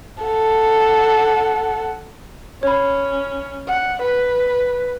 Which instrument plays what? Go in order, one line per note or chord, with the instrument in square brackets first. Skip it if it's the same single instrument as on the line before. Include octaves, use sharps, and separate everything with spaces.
[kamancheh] A4 F#5
[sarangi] C#4 [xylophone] C#5 B5
[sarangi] F#5
B4